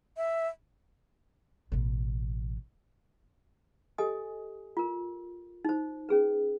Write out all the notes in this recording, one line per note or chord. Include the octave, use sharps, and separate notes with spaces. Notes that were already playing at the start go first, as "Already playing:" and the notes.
E5
A1 B2
G4 A4 D#5 G#5 D#6
F4 A#4
D#4 C5
C#4 G#4 B4